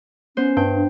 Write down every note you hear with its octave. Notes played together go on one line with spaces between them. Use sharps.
B3 C#4 C5
G2 G5
D4